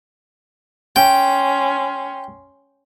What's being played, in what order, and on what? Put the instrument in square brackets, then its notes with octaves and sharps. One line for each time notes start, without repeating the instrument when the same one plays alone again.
[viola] C#4 C6 [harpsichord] G5